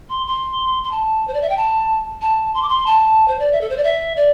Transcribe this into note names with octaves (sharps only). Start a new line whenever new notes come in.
C6
C6
C6
A5
C5
D5
E5
G5
A5
A5
C6
D6
C6
A5
C5
D5
E5
A4
C5
D5
E5
D5